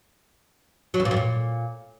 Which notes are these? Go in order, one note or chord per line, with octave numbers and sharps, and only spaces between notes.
F#3
E2
A#2
F2
A#2